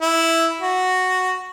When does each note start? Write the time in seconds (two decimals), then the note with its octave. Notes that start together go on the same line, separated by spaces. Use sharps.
0.01 E4
0.61 F#4